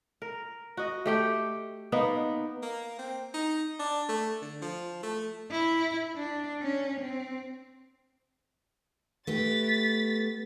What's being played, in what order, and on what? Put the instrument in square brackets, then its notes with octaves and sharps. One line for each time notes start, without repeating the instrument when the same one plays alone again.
[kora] A#4
F#4 D#5
A3 G4 G5
A#3 B3 D#4 B4
[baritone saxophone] A#3
C4
D#4
D4
A3
D3
F3
A3
[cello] E4
D4
C#4
C4
[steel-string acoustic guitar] A3 B3 G4 [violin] A6 B6